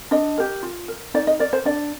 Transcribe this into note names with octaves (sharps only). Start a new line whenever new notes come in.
D4 D#5
G4 A#4
F4
A#4
D#4 D5
D#5
A#4 D5
C5
D4 D5